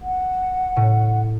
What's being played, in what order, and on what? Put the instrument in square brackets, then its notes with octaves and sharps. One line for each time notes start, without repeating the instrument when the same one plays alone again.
[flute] F#5
[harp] A2